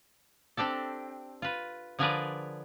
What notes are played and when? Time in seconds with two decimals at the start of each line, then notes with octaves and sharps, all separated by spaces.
0.57 C4 D4 G4 A4
1.42 F4 B4
1.99 D3 F3 G#4 A#4 B4 D5